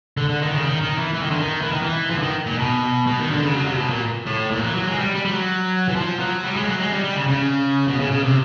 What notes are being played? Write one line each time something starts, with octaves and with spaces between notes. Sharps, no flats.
D3
D3
D#3
C#3
D#3
D#3
E3
E3
D#3
D3
D#3
E3
D#3
E3
F3
D3
D#3
A#2
B2
B2
D#3
D3
C#3
F#3
C3
B2
A#2
A2
A#2
E3
F#3
G#3
G3
G3
G3
F#3
E3
F3
F#3
G3
G#3
F3
F#3
G#3
G3
G3
C#3
C#3
B2
C#3
C#3
C3